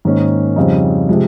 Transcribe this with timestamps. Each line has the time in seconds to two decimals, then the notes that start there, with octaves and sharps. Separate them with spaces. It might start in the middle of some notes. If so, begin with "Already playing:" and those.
0.05 G#2 D#3 A#3 C#4
0.56 F2 C#3 G3 C4 D#4
1.09 C3 F3 G#3